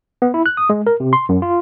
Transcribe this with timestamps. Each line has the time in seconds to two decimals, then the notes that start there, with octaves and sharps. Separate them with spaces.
0.22 B3
0.34 E4
0.46 F#6
0.57 D#6
0.70 G#3
0.87 A#4
1.00 C3
1.13 C6
1.29 F#2
1.42 F4